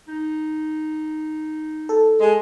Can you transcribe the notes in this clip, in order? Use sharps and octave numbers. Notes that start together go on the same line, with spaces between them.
D#4
A4
G#3